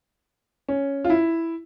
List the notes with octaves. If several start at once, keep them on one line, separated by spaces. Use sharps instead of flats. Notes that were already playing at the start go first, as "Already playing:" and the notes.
C#4
F4
E4